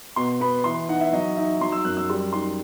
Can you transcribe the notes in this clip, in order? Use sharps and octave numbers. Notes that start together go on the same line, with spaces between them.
B2 C6
B3 B5
E3 C6
D#4 F#5
E5
F#3 D#5
D#4 E5
F#3 C6
E6
F#2 F#6
E6
G3 C6
D#4 C6